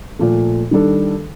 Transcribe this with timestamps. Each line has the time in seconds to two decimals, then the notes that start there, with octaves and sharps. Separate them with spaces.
0.19 A#2 F3 A3
0.71 D#3 G3 D4 A4